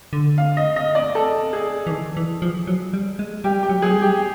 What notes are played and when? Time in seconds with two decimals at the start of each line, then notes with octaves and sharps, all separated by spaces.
0.13 D3
0.38 F5
0.57 D#5
0.76 D#5
0.95 D5
1.15 A4
1.53 G#4
1.87 E3
1.91 D#3
2.17 E3
2.42 F3
2.67 F#3
2.94 G3
3.19 G#3
3.44 G3 G4
3.63 G4
3.69 F#3
3.82 F#3 G#4
3.95 G3
4.02 G4